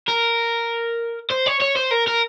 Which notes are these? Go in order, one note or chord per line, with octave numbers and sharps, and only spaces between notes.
A#4
C5
C#5
C#5
C5
A#4
A#4